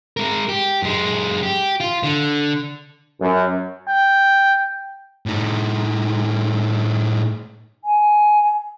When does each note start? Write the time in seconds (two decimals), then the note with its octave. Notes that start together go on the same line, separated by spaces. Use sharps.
0.17 G#3 A#4
0.49 G4
0.82 F#2 G#3
1.43 G4
1.80 F4
2.03 D3
3.21 F#2
3.88 G5
5.26 A2 D#4
7.83 G#5